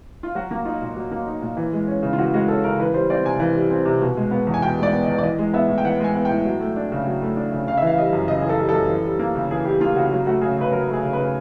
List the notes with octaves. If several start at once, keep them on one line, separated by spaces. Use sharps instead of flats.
F4
F#3 F#4
A#3
D#4 F4
A#2
F#3
A#3
D#4
A#2
E3
G#3
C#4
C#3
F4
E3 F#4
G#3 F#4
C#4 A4
C#3 A#4
E3 B4
G3 C5
C4 D5
C3 G#5
E3
G3
C4
C3
B2
G#3
B3
E2
G#5
B2 G5
G#3 D5
B3
D#5
E2
D5
E3 D#5
G#3
B3 E5
A2
G5
E3 F#5
G#3 G#5
B3
A2 G5
F#3
A3
D4
C#3
F#3
A3
D4
C#3
C#3 F5
E3 E5
F5
G3 D#5
F#2
C#3 D#5
E3 G#4
A4
G3
F#2 A4
E3
G3
A#3
C#3
E3 G#4
G3 G4
A#3 F4
C#3 F#4
F#3
A3 F#4
C#3 G#4
C#3 B4
F#3 A#4
A3
G#4
C#3
B4
C#3